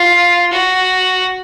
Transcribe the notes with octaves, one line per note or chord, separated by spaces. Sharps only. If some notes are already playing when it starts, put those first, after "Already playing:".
Already playing: F4
F#4